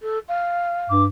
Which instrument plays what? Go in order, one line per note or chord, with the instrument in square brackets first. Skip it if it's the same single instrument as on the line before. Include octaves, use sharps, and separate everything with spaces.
[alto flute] A4
F5
[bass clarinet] G2 [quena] D6